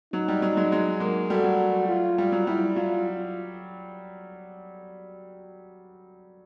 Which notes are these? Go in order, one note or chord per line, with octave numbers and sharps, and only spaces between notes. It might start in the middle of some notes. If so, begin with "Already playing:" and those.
F#3 D#4
G3
F#3
F#3 G#3
F#3 G#3
G#3 A#3
G3 A3 F#4
F#3
F4
G3
F#3
G3 E4
F#3 F4